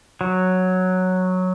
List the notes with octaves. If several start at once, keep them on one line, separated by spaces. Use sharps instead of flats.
F#3